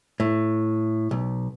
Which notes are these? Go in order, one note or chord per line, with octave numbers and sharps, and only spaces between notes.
A2
B1